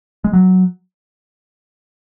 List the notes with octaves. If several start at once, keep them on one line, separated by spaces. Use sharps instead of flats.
G#3
F#3